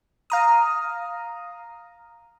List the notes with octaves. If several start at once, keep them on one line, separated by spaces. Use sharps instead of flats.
F5 A#5 D#6